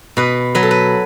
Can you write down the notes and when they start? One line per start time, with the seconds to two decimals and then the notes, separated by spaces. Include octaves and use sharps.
0.17 B2 B4
0.55 F#3 B4
0.63 A4
0.71 B4